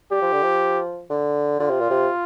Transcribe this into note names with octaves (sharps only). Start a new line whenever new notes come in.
G3 G4
F3
D3
F3
D3
D3 F4
C3
A#2
C3